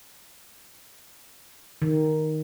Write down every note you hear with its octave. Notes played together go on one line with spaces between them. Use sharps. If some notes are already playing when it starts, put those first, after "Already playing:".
D#3